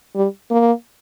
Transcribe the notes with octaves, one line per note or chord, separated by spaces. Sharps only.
G3
A#3